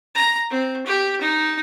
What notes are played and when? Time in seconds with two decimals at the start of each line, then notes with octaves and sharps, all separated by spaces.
0.15 A#5
0.50 C4
0.87 G4
1.21 D#4